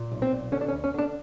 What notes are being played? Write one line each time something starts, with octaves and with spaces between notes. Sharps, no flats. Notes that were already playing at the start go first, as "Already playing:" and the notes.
Already playing: A#2
B1
C4
A#2
D3 C#4
D4
C#4
D2
C#4
D3 D4